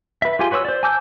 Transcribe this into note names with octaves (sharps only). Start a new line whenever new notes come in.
B4 E5
F4 G4 G#4 G#5 C6
F#4 B4 C#5 C#6 E6
C5 D5
G#5 A5 D6 E6 G6